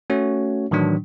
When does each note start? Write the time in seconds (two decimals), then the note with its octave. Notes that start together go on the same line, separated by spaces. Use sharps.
0.10 A3 C#4 F#4 C#5
0.71 A2 D#3 E3 F#3 D4